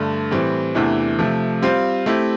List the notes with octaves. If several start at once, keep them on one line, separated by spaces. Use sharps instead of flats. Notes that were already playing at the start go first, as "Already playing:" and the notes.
Already playing: G2 D3 A3
A2 E3 G3 C4
E2 C3 E3 A3 D4
C3 F3 A3
G3 C4 F4 C5 F5
A3 C4 E4 G4